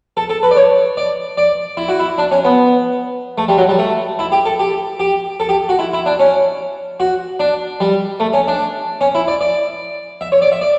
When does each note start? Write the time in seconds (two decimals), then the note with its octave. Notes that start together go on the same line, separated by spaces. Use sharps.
0.17 A4
0.30 A4
0.43 B4
0.51 D5
0.57 C#5
0.97 D5
1.38 D5
1.77 E4
1.89 F#4
2.00 E4
2.18 D4
2.31 C#4
2.45 B3
3.38 A3
3.48 G3
3.58 F#3
3.69 G3
3.79 A3
4.19 E4
4.32 G4
4.45 A4
4.59 G4
5.00 G4
5.40 A4
5.49 G4
5.69 F#4
5.79 E4
5.93 E4
6.06 D4
6.19 C#4
7.00 F#4
7.40 D4
7.80 G3
8.20 A3
8.33 C#4
8.48 D4
9.01 C#4
9.15 E4
9.28 D5
9.41 D5
10.21 E5
10.32 C#5
10.42 D5
10.52 E5
10.61 D5